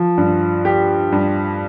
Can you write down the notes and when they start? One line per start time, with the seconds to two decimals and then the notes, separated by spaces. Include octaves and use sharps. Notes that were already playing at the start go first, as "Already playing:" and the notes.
Already playing: F3
0.18 G2
0.65 G4
1.12 G2